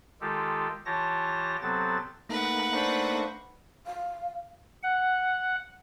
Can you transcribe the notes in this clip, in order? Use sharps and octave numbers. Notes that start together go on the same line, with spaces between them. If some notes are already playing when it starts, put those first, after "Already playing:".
D#3 G#3 F4 G4 A4
E3 F4 G4 C#5 A5 A#6
C3 F#3 B3 C4 A4 A6
A3 A#3 D#4 B4 F#5
D4 C5 C#6
F5
F#5